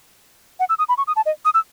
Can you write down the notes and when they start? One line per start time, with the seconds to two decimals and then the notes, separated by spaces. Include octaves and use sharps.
0.60 F#5
0.69 E6
0.78 D#6
0.89 B5
0.97 C#6
1.07 D#6
1.16 A5
1.26 D#5
1.45 D#6
1.54 E6